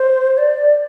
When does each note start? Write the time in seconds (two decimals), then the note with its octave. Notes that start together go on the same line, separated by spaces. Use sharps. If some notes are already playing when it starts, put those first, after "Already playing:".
Already playing: C5
0.38 D5